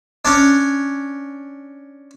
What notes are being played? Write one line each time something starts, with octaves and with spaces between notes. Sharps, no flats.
C#4 D4